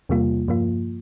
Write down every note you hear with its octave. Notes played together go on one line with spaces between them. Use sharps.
E2 C3 G3 A#3 F4
G2 F3 A#3 F4